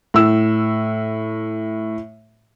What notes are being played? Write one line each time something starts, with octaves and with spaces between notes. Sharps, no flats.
A2 E6